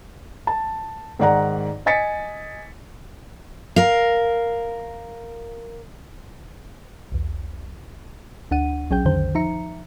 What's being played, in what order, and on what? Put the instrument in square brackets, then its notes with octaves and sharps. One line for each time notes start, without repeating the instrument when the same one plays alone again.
[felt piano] A5
G#2 D#3 D5 F#5 A#5
D#5 G#5 A6 B6 C#7
[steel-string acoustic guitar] A#4 F5
[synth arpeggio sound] B1 E2
D2 D4 F#5 D#7
A#1 F#3 C#4 G#4 G5 G6
B1 F2 D3 D#3 C5 G6
F3 D#4 E5 A#5 C#7